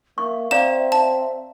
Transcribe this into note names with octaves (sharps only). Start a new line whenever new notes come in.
A#3 E5 C#6
C4 D5 F5 A#5 E7
A5